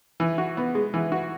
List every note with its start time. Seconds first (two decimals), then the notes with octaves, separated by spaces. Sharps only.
0.20 E3
0.38 F#4
0.57 B3
0.75 G#3
0.94 E3
1.12 F#4